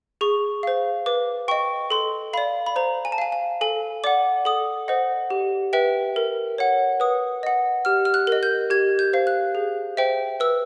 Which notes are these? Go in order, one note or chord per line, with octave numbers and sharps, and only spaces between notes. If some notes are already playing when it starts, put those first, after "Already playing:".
G#4 C#6
C5 F5
B4 D6
D#5 G5 C#6
A4 C6
D5 F5 B5
B5
C5 A#5
G#5
A5
F5 G#5
G#5
A4 G#5
D5 F#5 D6
A4 D#6
C5 D#5 F#5
G4
B4 E5 G5
A#4
C#5 F#5
B4 D#6
D#5 F#5
G4 F6
F6
F#6
A#4 D#5
G6
G4 G#6
G6
C5 F5
F#6
G#4
C5 E5 G5
B4 E6